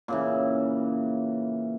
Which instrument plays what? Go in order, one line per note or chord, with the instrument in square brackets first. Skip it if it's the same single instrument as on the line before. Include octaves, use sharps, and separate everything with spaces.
[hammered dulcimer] A#2 C#3 E3